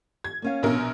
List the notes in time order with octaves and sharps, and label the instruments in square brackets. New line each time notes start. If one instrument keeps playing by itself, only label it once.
[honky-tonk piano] G#6
[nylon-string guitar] A#3 C#4 F5
[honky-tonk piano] A#1 B2 A#4